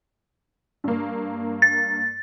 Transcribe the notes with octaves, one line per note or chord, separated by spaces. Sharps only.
G2 A#3
A6